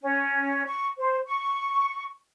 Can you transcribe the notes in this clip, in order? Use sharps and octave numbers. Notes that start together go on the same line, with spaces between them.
C#4
C#6
C5
C#6